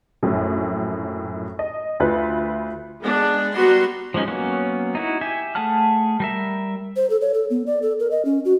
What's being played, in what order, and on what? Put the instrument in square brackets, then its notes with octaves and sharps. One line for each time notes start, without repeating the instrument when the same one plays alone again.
[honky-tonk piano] A#1 F#2 A2
D#5
D2 F4 B4
[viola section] G#3 B3 D4
G3 B3 F#4 B4 A#5 C6
[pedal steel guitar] F3 F#3 G#3 C#4 D#4
F#3 A#3 B3 C#4
D#4 E4 F#4
G4 E5 G#5
A3 G#4 F#5 A5 F6
G3 A#4 E5
[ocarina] C5
A4
C#5
A4
B3
D5
A4
A#4
D#5
C#4
F#4